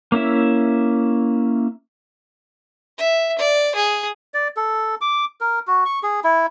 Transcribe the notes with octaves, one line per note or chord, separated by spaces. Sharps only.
A#3 C#4 E4 E5
E5
D5
G#4
D5
A4
D6
A#4
F#4
C#6
G#4
E4